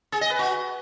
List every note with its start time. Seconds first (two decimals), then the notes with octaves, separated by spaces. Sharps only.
0.12 G#4
0.21 D#5
0.30 B4
0.39 F#4